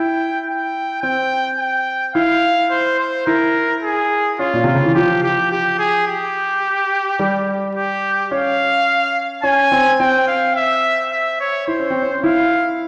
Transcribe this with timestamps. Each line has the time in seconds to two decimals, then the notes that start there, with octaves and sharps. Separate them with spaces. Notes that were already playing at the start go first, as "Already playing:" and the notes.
Already playing: E4 G5
0.47 G5
1.02 C4 G5
1.58 G5
2.15 E4 F5
2.71 C5
2.99 C5
3.27 E4 A#4
3.83 G#4
4.39 C#4 F4
4.53 A#2
4.64 C3 F4
4.75 C#3
4.85 E3
4.95 F3 G4
5.23 G4
5.52 G4
5.79 G#4
6.07 G4
7.19 G3
7.75 G4
8.31 C#4 F5
9.43 C#4 G#5
9.72 C4
9.99 C4 G5
10.28 F5
10.56 E5
11.11 E5
11.40 C#5
11.67 E4 C5
11.79 C#4
11.90 C4
12.02 C#4
12.24 E4 F5